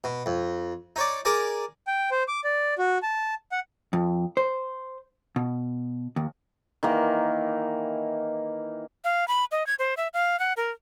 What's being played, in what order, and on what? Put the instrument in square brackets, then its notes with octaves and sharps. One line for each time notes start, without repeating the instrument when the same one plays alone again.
[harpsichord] B2
F2
D#4 C#5 D5
G#4 A#4 D5 G#5
[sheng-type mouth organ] G5
C5
D6
D5
F#4
A5
F#5
[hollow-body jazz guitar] F2
C5
B2
D#2
[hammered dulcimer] D#3 E3 A#3
[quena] F5
B5
D#5
G#6
C5
E5
F5
F#5
A#4